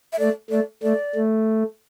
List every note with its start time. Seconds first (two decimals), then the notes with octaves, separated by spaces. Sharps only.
0.13 E5
0.19 A3 D5
0.50 A3 D5
0.83 A3 D5
1.15 A3